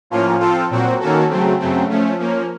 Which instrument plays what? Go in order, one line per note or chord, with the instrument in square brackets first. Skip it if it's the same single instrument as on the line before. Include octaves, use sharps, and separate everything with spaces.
[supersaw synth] A2 F3 A#3 C#4 F4
F3 C4 F4 A4
A#2 F#3 C4 F#4
D#3 A#3 C#4 F#4 A4
C#3 F#3 A3 C4
F#2 C#3 F#3 A3 C4
F3 A3 C#4
F3 A#3 C#4